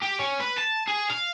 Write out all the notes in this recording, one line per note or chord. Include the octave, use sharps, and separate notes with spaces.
G4
C#4
B4
A5
G#4
F5